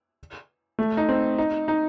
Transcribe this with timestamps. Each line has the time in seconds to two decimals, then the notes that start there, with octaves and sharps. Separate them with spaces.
0.79 A3
0.97 D#4
1.09 C4
1.38 D#4
1.68 D#4